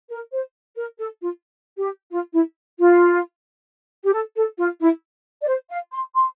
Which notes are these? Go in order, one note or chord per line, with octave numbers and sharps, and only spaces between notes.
A#4
C5
A#4
A4
F4
G4
F4
E4
F4
G4
A4
A4
F4
E4
D5
C5
F5
C6
C6